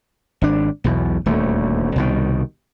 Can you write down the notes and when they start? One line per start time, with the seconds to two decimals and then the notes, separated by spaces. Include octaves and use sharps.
0.42 G#1 D4
0.84 B1 E2 B2
1.26 D#1 D2 A3
1.96 C2 B2 D#3